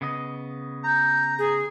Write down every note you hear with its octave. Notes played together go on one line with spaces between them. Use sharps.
C#3 B3 D#5
A#5 G6
G#4